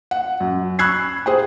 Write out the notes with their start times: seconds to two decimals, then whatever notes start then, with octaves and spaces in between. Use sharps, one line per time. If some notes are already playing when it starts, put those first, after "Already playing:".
0.11 F#5
0.40 F#2
0.79 B5 C#6 E6 F#6 G#6 C7
1.26 G#4 C5 G5